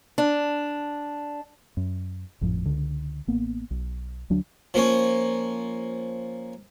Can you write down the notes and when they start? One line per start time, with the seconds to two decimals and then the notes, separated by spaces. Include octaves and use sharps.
0.18 D4
1.77 F#2
2.41 G#1 F2 A2 F3
2.65 C#2 D3
3.27 A1 A#3 B3
3.71 B1
4.30 D2 F#3 D4
4.74 F3 A#3 C#4